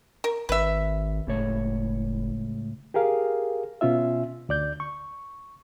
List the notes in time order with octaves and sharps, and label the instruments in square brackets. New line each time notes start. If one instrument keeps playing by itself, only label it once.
[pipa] A#4
[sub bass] G#1 [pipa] B4 E5
[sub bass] F#1 [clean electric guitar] C#2 A2 C#5
[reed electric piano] G4 G#4 A#4 F5
B2 C#4 F4 E5
D2 D5 G6
C#6